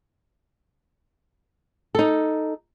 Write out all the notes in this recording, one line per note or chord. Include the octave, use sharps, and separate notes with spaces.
D#4 A4